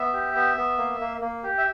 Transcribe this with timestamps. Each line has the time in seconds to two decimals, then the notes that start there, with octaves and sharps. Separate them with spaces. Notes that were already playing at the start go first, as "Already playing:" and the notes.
Already playing: B3 E5
0.13 G4
0.35 B3
0.57 B3
0.78 A#3
1.01 A#3
1.22 A#3
1.43 G4
1.58 E5